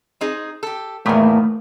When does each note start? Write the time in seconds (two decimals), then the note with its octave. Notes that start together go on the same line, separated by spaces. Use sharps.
0.21 C4 D#4 G#4
0.63 G4 A4
1.06 E2 A2 D#3 E3 A3 A#3